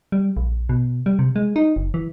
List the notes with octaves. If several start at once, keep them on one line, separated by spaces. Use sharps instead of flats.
G3
A#1
B2
G3
C3
G#3
D#4
F#1
E3